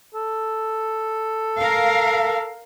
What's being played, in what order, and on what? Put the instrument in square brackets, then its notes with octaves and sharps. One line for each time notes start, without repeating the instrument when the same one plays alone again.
[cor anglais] A4
[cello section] A#4 F5